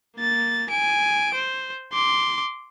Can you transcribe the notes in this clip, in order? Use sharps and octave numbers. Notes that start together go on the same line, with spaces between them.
A#3 A6
G#5 D7
C5
C6 D6